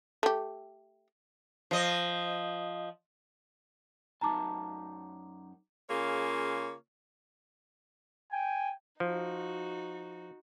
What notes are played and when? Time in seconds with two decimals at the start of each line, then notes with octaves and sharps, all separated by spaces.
0.23 A3 G4
1.71 F3 D#5
4.21 F#2 D#4 A5 A#5 D6
5.90 C#3 A#3 F4 G#4 C#5
8.32 G5 G#5
9.00 F3 D#4 F#4